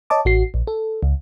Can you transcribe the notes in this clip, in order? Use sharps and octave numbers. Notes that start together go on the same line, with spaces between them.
C#5 D#5 A5 D6
A1 F#4 C7
A#1
A4
C#2